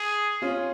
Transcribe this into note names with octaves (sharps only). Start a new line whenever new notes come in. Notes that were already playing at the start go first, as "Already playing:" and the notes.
Already playing: G#4
C#4 F4